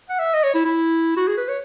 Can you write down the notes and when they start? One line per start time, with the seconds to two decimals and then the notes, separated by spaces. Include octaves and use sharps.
0.09 F#5
0.19 E5
0.34 D#5
0.44 C#5
0.55 E4
0.65 E4
1.17 F#4
1.28 G#4
1.38 B4
1.49 C#5